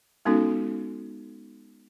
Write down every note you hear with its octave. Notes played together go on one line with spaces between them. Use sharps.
G#3 B3 C#4 D#4 F#4 A4